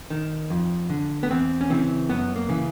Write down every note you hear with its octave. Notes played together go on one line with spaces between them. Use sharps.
D#3
F2
D3
B3
E2 C4
C#4
C#3 E3 C4
F#2 B3
A#3
C#3 E3